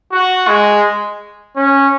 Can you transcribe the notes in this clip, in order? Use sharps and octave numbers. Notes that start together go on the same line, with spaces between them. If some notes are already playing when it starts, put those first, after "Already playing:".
F#4
G#3
C#4